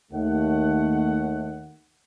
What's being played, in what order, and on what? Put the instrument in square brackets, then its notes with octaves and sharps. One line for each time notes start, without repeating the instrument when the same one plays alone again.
[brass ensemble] D#2 A3 F#5